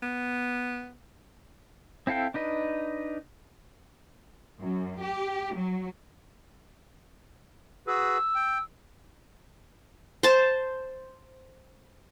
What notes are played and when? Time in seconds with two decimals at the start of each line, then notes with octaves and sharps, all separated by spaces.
0.02 B3
2.07 C4 E4 A4 F5 G5
2.34 D4 D#4 B4 D#5
4.61 F#2
5.01 G4
5.55 F#3
7.87 F#4 G#4 B4 E6
8.35 G5
10.23 C5 A5